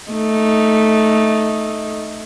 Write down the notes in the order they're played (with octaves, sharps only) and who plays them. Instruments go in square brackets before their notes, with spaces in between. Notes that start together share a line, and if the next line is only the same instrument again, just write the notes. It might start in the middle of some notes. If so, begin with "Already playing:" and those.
[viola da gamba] A3 D#4